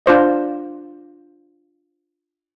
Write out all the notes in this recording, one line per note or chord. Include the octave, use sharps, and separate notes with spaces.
D4 F4 C5 D#5